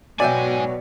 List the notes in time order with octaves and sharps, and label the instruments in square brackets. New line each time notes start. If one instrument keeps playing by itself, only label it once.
[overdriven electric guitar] G#2 G#5 [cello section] B2 [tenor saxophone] F#3 [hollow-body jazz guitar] D5 E5 G5